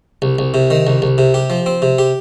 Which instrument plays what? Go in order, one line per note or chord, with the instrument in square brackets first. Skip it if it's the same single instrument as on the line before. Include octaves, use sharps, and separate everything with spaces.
[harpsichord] C2
C2
C3
D#3
C2
C2
C3
G4
F3
C4
C3
G4